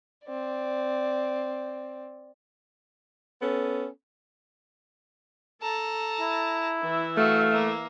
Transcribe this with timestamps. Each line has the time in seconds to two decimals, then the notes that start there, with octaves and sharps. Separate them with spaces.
0.24 C4 D5
3.42 B3 C#4 A4
5.62 A4 A5 A#5
6.21 E4
6.82 E3 E5
7.17 A3 F#4 F5
7.53 A#3